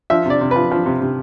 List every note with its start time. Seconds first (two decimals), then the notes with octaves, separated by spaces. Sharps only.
0.10 F3 E5
0.26 C3 D5
0.41 C3
0.51 F3 B4
0.71 F3
0.86 C3
1.01 C3